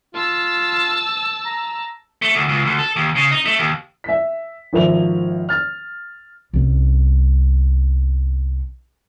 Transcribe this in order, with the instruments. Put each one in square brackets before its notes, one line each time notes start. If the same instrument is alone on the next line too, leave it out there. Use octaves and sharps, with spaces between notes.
[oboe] F4 [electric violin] A5 E6
[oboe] A#5
[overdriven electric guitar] A3
D2
C#2
D2
A4
D#2
C#3
D#4
A3
D#2
[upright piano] E5 B6
G#1 F3 A#4 E5 F7
F6 A6
[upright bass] C2 C#4